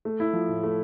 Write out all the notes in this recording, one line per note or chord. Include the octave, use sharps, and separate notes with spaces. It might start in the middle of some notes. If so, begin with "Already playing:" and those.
A3
E4
F3
A2
A3